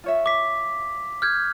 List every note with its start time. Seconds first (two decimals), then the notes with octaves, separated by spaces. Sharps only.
0.04 F4 C#5 E5
0.26 D6 B6
1.22 F6 G6 G#6